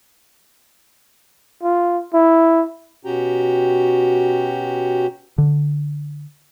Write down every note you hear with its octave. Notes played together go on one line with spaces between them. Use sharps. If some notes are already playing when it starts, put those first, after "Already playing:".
F4
E4
B2 C#4 F#4 G4 G5 A#5
D3